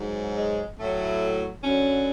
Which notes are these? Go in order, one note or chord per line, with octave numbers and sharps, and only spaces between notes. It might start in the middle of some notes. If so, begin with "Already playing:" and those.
Already playing: G#2 F#3
G#3
A2 F#3 A3
F#2 D3 F#3 C#4